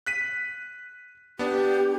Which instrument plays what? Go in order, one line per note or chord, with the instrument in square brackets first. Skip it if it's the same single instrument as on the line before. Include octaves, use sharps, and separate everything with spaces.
[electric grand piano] F#6 B6 D#7
[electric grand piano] B3 D4 [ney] G4